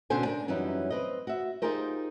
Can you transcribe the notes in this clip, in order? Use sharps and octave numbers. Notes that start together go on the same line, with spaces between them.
B2 D3 C#4 C5 G#5
D4 A#4 G#5
F#2 E3 G3 C#4 D#4 E4
C4 B4 D#5
F#4 E5
D#4 F4 G4 G#4 A#4 C5